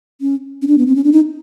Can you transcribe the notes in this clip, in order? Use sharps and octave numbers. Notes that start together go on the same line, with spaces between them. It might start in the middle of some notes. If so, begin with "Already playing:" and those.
C#4
C#4
D4
B3
C4
C#4
D4
D#4